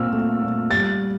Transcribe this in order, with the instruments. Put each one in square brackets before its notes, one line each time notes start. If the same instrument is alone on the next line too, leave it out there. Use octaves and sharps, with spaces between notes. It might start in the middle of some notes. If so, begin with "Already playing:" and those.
Already playing: [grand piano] A#2 C4 E6 F6
A3
A#2
G3 A6